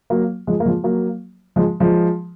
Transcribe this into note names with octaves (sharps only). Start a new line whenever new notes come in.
F#3 A#3
F3 G#3
A#3
F3 G#3
F#3 A#3
F3 G#3
F3 G#3